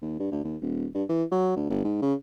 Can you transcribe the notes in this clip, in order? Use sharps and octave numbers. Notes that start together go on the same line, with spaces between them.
D#2
G2
D2
D#2
D#1
G2
E3
F#3
D2
G1
G#2
C#3